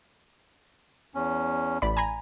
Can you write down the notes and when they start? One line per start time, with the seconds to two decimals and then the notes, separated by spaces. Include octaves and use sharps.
1.15 E2 C#4
1.82 A1 D5 B5
1.97 G#5 A#5 B5